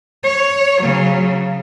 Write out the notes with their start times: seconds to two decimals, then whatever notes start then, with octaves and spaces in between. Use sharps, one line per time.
0.24 C#5
0.82 C#3 F#3